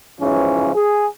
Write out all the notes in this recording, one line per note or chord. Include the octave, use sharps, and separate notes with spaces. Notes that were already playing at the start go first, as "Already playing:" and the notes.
B1 G#2 C#3 E3 F3 C#4
G#4